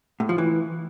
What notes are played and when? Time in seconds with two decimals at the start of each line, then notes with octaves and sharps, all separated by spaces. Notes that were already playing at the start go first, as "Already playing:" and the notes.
0.20 A2
0.29 F3
0.38 E3